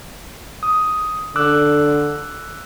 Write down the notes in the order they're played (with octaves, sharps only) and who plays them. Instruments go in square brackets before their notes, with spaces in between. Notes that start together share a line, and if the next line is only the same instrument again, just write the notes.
[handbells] D#6
[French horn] D3 [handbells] D6 E6 F#6